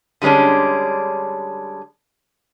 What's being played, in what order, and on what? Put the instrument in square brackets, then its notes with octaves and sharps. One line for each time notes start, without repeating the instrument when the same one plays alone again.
[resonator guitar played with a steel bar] D3 G3 G#3 C#4 D4